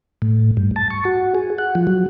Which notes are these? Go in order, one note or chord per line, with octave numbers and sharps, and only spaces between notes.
A2
G2
A5
C#6
F#4
G#4
F#5
F3
F#3